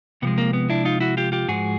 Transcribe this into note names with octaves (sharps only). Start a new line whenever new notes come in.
C3 F3 G#3 B3
A#3
B3
D4 E4
D#4 F4
E4 F#4
F4 G4
F4 G4
G#2 F3 G#3 F#4 G#4